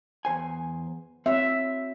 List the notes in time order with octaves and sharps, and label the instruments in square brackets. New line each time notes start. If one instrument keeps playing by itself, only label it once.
[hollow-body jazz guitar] E2 C5 G#5
[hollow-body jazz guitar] C4 F#4 C#5 [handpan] E5